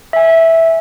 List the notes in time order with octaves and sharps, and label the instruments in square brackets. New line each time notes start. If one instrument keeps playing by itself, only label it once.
[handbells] E5 G#5